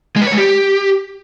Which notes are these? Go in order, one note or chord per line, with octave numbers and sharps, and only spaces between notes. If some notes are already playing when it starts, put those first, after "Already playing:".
G#3
B4
C#5
G#3
G4